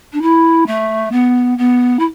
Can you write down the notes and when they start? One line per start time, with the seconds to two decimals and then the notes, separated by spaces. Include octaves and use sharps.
0.13 D4
0.22 E4
0.67 A3
1.12 B3
1.58 B3
1.99 E4